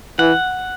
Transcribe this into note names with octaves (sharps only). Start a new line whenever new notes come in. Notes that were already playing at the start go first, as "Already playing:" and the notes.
E3 F#5